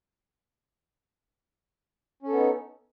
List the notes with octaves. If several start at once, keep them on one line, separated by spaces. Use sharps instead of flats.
B3 C#4 D#4 A4